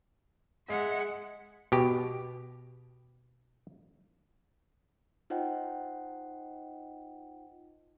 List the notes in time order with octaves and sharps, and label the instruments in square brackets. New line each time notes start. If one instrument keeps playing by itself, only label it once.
[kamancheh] G#3 [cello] E5 F#5
[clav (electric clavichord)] B2 G4
[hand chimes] D#4 F4 C5 D#5 F#5 G5